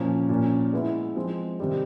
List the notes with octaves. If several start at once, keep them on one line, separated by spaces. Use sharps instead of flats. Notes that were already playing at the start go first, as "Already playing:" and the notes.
Already playing: A#2 F3 A#3 C#4
A#2 F3 A#3 C#4
G#3 B3 E4
F3 G#3 C4
C3 D#3 G3 C4